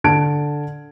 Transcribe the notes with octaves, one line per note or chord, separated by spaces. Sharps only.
D3 A5 G#6 D7